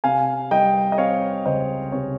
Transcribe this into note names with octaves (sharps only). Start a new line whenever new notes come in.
C3 F5 G#5
G3 D#5 G5
D#5
C4 C#5 F5
C#2 C5 D#5
C3 C#5